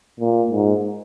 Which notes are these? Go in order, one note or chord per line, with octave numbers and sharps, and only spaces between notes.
A#2
G#2